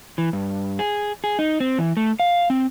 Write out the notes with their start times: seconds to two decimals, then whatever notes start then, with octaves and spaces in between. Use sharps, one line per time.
0.18 E3
0.33 G2
0.79 G#4
1.24 G#4
1.39 D#4
1.60 C4
1.78 E3
1.97 A3
2.20 F5
2.50 C4